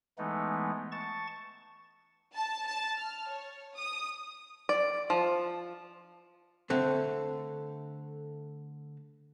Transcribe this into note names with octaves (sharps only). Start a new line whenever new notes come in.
E3 G#3 A3 B3 D#4
A5 C#6 A6
A5
A5
F6
C#5
D#6
D5
F3
D3 A3 C4